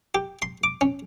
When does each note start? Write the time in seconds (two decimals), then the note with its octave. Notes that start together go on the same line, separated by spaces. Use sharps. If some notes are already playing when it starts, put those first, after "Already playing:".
0.15 G4
0.42 C6
0.64 D6
0.81 C#4